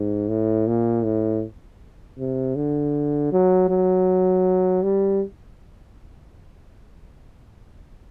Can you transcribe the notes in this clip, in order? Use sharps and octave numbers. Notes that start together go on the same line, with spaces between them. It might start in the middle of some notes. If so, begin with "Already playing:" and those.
Already playing: G#2
A2
A#2
A2
C3
D3
F#3
F#3
G3